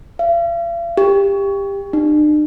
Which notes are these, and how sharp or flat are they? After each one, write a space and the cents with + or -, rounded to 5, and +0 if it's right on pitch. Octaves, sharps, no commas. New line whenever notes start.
F5 -45
G4 +20
D4 +45